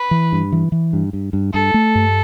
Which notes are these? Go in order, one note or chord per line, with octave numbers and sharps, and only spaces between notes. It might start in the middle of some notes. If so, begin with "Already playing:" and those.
Already playing: B4
E3
G2
E3
E3
G2
G2
G2
G2 A4
A3
G2